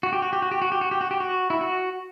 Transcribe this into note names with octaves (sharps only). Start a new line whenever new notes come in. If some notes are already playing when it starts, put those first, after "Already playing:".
F#4
G4
F#4
G4
F#4
G4
F#4
G4
F#4
G4
F#4
G4
F#4
E4
F#4